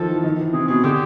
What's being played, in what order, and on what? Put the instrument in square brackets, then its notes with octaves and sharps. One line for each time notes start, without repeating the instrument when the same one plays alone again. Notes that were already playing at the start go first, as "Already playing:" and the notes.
Already playing: [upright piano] D#3 F3 [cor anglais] A4
[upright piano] E3
D#3
E3
[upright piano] C3 [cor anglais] G#4
[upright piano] B2 [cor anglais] G#4
[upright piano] D3 [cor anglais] G4